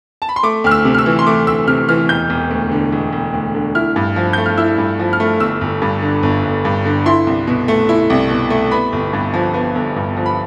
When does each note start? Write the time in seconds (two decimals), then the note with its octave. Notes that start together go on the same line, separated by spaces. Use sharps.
0.22 A5
0.29 B5
0.36 C6
0.43 A3 D6
0.64 D2 F6
0.71 E6
0.85 C3
0.94 F6
0.98 E6
1.06 E3
1.19 C6
1.27 A3 D6
1.47 D2 E6
1.68 C3 F6
1.89 E3 F6
2.09 E1 G6
2.30 E1
2.51 D2
2.71 D3
2.92 E1
3.13 E1
3.34 D2
3.54 D3
3.75 E4 F6
3.96 G2
4.16 F3
4.33 A3 G6
4.46 F6
4.58 E4 E6
4.78 G2
4.99 F3
5.13 F6
5.20 A3
5.40 G1 E6
5.61 G1
5.82 G2
6.03 D3
6.23 G1
6.45 G1
6.65 G2
6.86 D3
7.06 E4 C6
7.27 C2
7.47 B2
7.68 A3
7.89 E4
8.10 C2
8.30 B2
8.50 A3
8.71 B3 B5
8.92 G1
9.13 G2
9.34 F3
9.54 B3
9.75 G1
9.96 G2
10.17 F3
10.26 B5